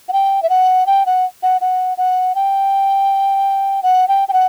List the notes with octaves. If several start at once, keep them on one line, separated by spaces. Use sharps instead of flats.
F#5
G5
E5
F#5
G5
F#5
F#5
F#5
F#5
G5
F#5
G5
G5
F#5